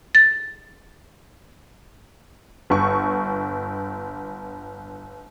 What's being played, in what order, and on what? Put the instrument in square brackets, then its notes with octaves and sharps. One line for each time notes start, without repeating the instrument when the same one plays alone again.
[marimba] A6
[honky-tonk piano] G1 C#6